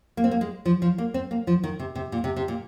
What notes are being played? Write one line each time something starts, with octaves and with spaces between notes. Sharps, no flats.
A#3
C4
A#3
G#3
F3
F3
A#3
C4
A#3
F3
D#3
C3
C3
A#2
C3
C3
A#2